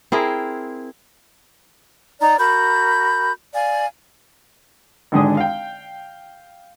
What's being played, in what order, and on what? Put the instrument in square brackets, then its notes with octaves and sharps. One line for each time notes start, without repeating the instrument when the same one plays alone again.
[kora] C4 E4 G#4 A#4
[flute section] D#4 D5 A#5
F#4 A#4 B5 G6
D5 F5 G#5
[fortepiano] G#1 G#2 D3 G#3 G#5 D#6
F5 G5